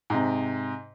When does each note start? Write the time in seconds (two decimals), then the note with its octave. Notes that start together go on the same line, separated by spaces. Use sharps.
0.10 G#2 C3